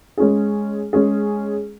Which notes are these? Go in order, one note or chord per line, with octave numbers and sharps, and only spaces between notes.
G#3 C#4 G#4
G#3 C#4 G#4